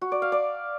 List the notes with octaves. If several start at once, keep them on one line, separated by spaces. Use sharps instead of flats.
F#4
D5
F5
D5